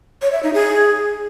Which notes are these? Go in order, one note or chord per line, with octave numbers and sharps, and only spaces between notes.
C#5
E5
D#4
G#4